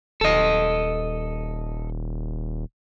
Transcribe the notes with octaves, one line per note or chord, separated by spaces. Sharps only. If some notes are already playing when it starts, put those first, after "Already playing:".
D#1 A4 D#5